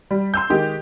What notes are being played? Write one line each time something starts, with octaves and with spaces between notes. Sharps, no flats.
G3
C6 E6 G6
D#3 G#3 G4